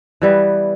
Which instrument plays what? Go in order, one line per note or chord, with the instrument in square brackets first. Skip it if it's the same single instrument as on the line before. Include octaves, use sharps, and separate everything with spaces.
[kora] E3 G3 B3